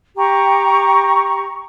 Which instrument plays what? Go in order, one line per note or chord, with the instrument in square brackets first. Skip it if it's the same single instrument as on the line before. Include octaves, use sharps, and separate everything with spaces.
[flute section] G4 A#5 C#6